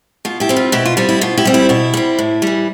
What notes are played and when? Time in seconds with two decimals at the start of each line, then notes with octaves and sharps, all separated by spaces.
0.25 B2 F4
0.40 E4 G4
0.49 G3 C4
0.56 F4
0.72 B2 E4 G4
0.85 F4
0.97 G3 C4 F4
1.09 E4
1.21 B2 F4
1.37 E4 G4
1.45 G3 C4
1.54 E4
1.69 B2 E4
1.94 G3 C4
2.19 A2
2.42 E3 G3